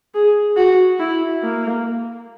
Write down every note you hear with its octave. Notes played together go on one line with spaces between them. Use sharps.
G#4
F#4
E4
A#3